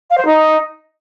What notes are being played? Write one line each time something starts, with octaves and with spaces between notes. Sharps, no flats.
F5
C5
D#4